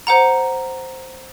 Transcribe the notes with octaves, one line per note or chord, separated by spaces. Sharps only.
C5 F#5 A#5